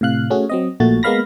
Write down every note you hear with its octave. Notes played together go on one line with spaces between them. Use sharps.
A2 C3 F5 F#6
A3 C#4 F#4 G#4
F#3 C4 D#5
A#1 A#2 A3 F#4 A6
G#3 A#3 B3 F5 B5 A#6